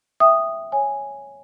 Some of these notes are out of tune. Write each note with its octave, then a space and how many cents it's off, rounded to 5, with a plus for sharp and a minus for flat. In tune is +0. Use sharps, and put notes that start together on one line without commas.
E5 +0 G5 +0 D#6 -5
C#5 +0 G#5 +0